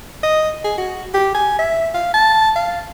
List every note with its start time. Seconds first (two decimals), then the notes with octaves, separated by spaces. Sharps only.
0.23 D#5
0.64 G#4
0.78 F#4
1.14 G4
1.34 G#5
1.59 E5
1.94 F5
2.14 A5
2.56 F5